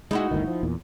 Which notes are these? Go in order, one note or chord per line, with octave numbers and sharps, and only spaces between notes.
G#3 D#4 E4 F#4
G1 D2 D#3
F3
E2 A#2